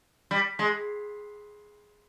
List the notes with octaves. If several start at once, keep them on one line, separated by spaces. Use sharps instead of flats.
G3
G#3